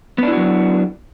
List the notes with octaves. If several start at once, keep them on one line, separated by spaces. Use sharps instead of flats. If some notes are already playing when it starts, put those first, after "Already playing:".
F#3 B3 D4 E4 F#4